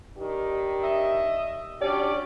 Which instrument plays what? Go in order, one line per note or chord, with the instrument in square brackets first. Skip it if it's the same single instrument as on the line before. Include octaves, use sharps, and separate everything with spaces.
[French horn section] D#3 D4 G4
[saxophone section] D#5 E5
[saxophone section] C#4 D5 [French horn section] D4 F#4 G4